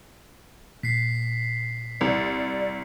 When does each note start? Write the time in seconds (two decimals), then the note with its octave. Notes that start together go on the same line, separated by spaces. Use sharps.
0.83 A#2 B6 C7
2.01 C2 D5